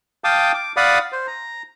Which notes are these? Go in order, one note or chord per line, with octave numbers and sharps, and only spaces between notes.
F5 G5 A5 D6 D#6
D6
D5 F5 F#5 B5 D#6
C5
A#5